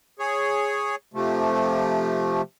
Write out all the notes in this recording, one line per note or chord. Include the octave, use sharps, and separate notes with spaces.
G#4 C#5
C3 F3 A3